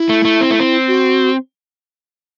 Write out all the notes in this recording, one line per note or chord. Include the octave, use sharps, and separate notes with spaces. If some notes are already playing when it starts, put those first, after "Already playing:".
Already playing: E4
A3
A3
C4
A3
C4
F#4